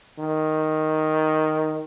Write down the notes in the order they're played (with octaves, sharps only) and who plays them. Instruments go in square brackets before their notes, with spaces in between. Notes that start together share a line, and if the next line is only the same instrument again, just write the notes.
[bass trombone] D#3